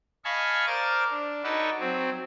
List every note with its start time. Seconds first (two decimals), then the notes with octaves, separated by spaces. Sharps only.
0.25 D#5 F5 G#5 A5 B5 C#6
0.67 A#4 C5 D5 D6 A6
1.10 D4
1.43 D#4 F#4 A4 B4 C#5 D5
1.80 F#3 C4